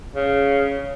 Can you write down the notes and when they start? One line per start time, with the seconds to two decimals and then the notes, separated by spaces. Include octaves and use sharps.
0.15 C#3